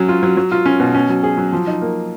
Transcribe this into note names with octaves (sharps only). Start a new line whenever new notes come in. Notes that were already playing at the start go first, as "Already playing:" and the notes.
Already playing: F#3 C#4
F4
F#3
F#3
F4
C#4
B2
C#4
F#3
G#4
F#3
F3
D#4
A#3